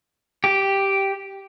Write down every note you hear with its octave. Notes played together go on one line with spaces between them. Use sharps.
G4